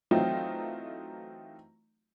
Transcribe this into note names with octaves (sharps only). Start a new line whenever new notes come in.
E3 F#3 A3 C4 D#4 F4